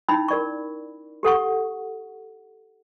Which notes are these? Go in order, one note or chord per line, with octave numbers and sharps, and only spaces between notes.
C#4 D#4 E4 B5 E6
A#4 D5 C#6
G4 A4 F#5 C#6